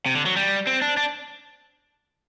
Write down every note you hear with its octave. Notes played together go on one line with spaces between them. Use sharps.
C3
D3
F#3
G3
C4
D4
D4